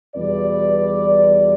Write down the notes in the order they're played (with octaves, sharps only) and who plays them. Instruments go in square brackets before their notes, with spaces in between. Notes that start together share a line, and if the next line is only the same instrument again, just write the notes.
[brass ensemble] E2 B2 G3 B4 D5